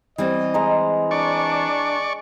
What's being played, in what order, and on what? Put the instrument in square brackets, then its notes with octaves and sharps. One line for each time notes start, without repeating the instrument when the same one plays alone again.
[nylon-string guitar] E3 G3 C4 [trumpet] D#5
[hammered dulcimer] G#3 A#5
[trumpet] D4 [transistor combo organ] D5 C#6